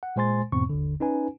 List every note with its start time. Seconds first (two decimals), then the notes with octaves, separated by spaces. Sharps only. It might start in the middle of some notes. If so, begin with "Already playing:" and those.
0.03 F#5
0.16 A#2 G#3 C5 G#5 C6 A6
0.52 E2 G#2 B2 C4 C#6
0.69 G1 D#2 D3
1.00 C#4 D#4 B4 G#5